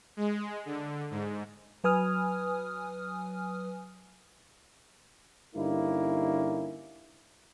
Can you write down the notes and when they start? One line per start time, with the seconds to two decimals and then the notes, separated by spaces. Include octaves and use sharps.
0.17 G#3
0.65 D3
1.11 G#2
1.84 F#3 B4 G#5 D#6 F6
5.56 G2 D3 A#3 C#4 D#4 E4